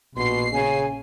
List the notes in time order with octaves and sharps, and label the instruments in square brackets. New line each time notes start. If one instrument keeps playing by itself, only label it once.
[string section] A#1 C7 [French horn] B2 [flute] C6
[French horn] C#3 [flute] G#5